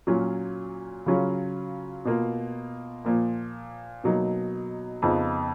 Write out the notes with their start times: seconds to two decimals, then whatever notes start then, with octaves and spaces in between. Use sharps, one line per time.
0.07 A#2 F#3 C#4 F4
1.06 C#3 F#3 C#4 F4
2.05 B2 A#3 F4
3.05 A#2 F3 A#3
4.04 B2 F#3 A#3 D#4
5.02 F2 C#3 F3 B3 D#4